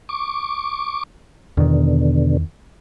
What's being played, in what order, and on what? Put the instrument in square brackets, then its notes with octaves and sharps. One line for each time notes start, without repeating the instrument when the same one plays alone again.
[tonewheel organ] C#6 D6
[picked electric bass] E2 D#3 [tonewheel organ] B2 D3